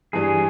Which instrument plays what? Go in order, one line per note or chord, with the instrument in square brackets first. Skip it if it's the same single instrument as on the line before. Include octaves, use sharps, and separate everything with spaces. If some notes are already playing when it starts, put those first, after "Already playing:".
[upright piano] G2 E3 G3 [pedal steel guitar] G#4